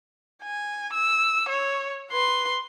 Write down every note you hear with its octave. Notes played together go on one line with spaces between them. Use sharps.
G#5
E6
C#5
B4 C6